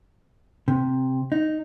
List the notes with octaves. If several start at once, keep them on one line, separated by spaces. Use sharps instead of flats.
C3
D#4